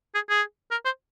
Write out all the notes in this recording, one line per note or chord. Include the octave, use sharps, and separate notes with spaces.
G#4
G#4
A#4
C5